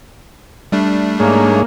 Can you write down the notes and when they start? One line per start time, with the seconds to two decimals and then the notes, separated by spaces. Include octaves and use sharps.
0.72 G3 A3 D4
1.20 G#2 A#3 G#4 C#5